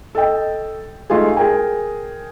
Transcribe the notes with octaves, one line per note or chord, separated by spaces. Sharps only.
A4 D#5 G5
G#3 A3 D#4 F4 G4 G#4
G#4 A#4 G5 G#5